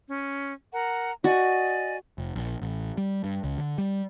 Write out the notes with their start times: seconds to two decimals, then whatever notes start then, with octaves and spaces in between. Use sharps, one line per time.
0.07 C#4
0.72 A#4 F#5 A#5
1.24 F#4 D5 D#5 G#5
2.18 F1
2.35 A#1
2.62 A1
2.98 G3
3.24 G2
3.44 C#2
3.58 D3
3.78 G3